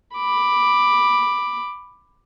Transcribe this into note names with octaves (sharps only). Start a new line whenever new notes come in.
B5 D6